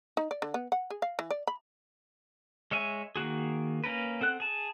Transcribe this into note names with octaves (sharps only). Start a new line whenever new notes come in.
D#4
D5
D3
B3
F#5
G#4
F5
E3
D5
B5
G#3 C#5 E5 G#5
D#3 A#3 F#4 G#4
A#3 C#4 A#4 B4
C4 A4 F#5 F#6
G#4 A5